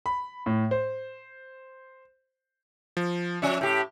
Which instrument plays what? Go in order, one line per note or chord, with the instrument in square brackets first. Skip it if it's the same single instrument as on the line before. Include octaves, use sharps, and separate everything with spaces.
[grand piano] B5
A2
C5
[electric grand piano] F3
[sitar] F3 C#4 [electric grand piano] E5
[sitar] A2 G4